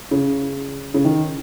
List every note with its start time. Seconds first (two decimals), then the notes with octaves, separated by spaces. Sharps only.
0.11 C#3
0.94 C#3
1.05 D#3